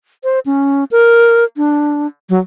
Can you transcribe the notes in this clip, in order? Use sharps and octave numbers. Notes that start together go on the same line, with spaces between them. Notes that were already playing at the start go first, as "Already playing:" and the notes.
C5
C#4
A#4
D4
F#3